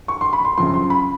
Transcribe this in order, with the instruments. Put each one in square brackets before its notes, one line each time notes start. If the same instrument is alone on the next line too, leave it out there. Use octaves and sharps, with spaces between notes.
[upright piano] C#6
C6
B5
C6
F#2 C#3 F3 C6
C6
B5